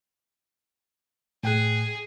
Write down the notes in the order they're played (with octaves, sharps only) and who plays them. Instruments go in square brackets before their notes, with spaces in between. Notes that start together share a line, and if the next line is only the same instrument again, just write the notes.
[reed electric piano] A2 G5 F#6 [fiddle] G#4